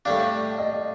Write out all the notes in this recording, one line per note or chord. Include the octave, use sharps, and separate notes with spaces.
A2 G3 D4 F5
D#5